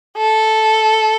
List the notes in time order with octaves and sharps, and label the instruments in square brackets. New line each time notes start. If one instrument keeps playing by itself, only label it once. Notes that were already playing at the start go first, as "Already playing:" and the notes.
[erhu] A4